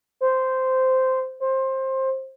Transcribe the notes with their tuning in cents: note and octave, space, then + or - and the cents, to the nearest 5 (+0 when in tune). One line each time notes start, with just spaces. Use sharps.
C5 -10
C5 +20